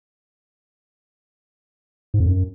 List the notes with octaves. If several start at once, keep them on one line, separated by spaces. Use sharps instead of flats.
G#2
F2
F#2